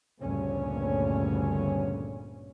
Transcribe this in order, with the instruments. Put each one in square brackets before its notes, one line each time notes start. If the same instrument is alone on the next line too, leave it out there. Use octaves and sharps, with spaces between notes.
[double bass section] G1 D2 G2 A#2 C#3 C#4